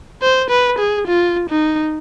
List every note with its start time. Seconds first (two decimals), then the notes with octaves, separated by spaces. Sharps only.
0.22 C5
0.50 B4
0.79 G#4
1.07 F4
1.49 D#4